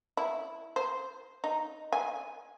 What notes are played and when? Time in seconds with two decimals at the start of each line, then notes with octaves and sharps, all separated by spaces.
0.17 E4
0.76 C5
1.44 D#4
1.93 G#5